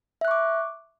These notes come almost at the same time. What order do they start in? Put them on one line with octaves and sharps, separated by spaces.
E5 F#6 C#6 D6